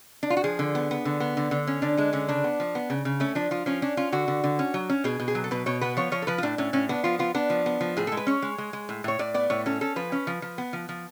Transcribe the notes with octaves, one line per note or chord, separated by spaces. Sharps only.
D4
F4
F#4
F3 G#4
D3
B3
B3
D3
B3
D3
D3
C#4
D3 D4
G#3 D4
D3 C#4
C#3 D4
B3
F3
B3
C#3
C#3
A3 C#4
F3 D4
F3 F4
F3 C#4
C#4 D4
C#4 F4
D3 F#4
D3
D3
C#4
F#3
C#4
B2 G#4
B2
G#4
F#3
A4
B2 B4
B2 C#5
B3 B4
F3 C#5
F3 C#5
A4
F3 B4
F4
A2 D4
A2 C#4
A2 C#4
B3 D4
F3 F4
B3 F4
B3 D4
F3
B3
F3
A2 G#4
A4
G#3
B4
C#4 C#5
G#3
G#3
G#3
A2
A2 C#5
A2 D5
B3 D5
A2 C#5
C#4 A4
C#4 A4
F3 B4
C#4
F3
F3
B3
F3
F3